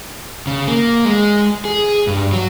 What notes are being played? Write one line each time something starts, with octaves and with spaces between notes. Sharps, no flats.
C#3
A#3
G#3
G#4
G2
F#3